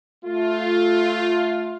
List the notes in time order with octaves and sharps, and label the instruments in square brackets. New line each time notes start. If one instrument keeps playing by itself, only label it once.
[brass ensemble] A3 F4